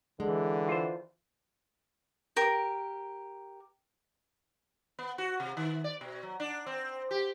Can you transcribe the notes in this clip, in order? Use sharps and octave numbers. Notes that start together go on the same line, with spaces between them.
D3 E3 G#3
F4 C5
G4 A#4
B3
F#4
C3
D#3
D5
B2
F#3
D4
C4
G4